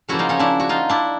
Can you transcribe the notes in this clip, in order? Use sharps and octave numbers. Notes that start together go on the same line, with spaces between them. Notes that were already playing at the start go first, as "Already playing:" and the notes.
C#3 F3 A#3 E4 F#4
D#4 F4
C#4 D#4
D4 E4
F#4
D#4 F4
D4 E4